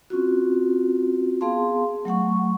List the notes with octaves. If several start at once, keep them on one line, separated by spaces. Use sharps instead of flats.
C4 C#4 F4 F#4
B3 G#4 F5 A5 C6
F#3 A3 F#5 C#6